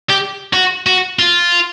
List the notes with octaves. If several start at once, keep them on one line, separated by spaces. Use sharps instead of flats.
G4
F#4
F#4
F4